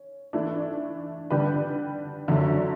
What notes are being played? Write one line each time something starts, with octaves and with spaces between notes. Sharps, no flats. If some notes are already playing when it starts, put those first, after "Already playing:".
Already playing: C#4
E3 A3 D4
D3 G3 D4 G4 B4
F#2 D3 F#3 A3 D4